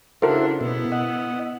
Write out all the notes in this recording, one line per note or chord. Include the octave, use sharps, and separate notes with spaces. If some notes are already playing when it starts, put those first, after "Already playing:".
C#3 D4 E4 F#4 A4 A#4 C5
B2 B3 E4
D#5 F#5